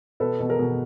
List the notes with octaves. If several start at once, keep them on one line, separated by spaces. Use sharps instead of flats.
B2 A4 B4
B2
G#4 A#4
B2